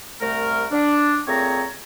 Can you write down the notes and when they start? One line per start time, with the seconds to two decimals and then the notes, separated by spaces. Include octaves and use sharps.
0.21 C2 A3 A#4
0.71 D4
1.28 A#2 A3 C4 G#4 C#5 A#5